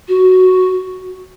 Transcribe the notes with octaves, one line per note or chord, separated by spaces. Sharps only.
F#4